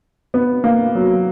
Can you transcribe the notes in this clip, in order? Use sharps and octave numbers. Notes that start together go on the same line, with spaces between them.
B3
A#3
F#3